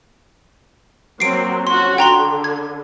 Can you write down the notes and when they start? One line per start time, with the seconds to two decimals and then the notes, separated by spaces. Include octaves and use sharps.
1.20 F#3 A#3 C4 C7 D7
1.67 C#4 F4 F#4 C6
1.98 D3 G5 A#5 C6
2.44 G#6